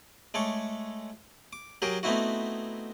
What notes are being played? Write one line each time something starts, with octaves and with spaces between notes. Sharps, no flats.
G#3 A3 A4 C#5 D6
D6
F#3 G4 G#4 A#4
A3 B3 C4 D#4 E4 F#4